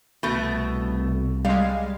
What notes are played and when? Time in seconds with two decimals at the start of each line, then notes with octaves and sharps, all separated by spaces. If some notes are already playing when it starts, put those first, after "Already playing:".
0.23 C2 B2 A3
1.45 G3 G#3 F5